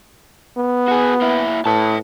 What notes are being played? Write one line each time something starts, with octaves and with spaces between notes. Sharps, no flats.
B3
F#4 G#4
A#3 E4
A2 B4 A5